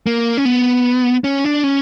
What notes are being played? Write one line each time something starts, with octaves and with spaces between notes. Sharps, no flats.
A#3
C#4
B3
C#4
D4
C#4